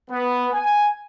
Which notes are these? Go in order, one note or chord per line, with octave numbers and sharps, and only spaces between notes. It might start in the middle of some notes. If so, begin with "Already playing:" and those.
B3
G#5